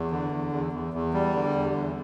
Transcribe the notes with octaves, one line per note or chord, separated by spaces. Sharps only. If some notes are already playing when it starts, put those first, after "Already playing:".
Already playing: E2
D3
E2
E2
E2
E2
G3
D3
E2
E2